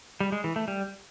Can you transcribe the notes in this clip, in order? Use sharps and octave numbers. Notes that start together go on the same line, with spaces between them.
G3
G#3
E3
A3
G3